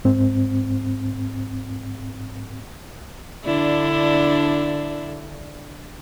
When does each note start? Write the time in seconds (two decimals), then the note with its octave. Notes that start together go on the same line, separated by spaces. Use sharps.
0.05 G#2 C4
3.45 D3 D4 E4